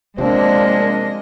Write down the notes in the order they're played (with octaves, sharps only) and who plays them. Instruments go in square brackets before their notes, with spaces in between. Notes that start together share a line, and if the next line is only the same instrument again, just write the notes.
[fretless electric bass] C3 F3 [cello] G#3 D#5 [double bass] A#3 D4 [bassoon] C4